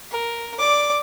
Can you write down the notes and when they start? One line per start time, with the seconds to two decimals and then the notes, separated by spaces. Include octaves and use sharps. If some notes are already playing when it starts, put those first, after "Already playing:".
0.11 A#4
0.59 D5 D6